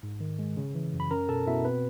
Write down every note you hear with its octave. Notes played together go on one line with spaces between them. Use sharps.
G#2
D#3
G#3
C#3
E3
F#2
B5
C#4 A#4 A#5
B2 A4 A5
B2 E4 E5
C4 B4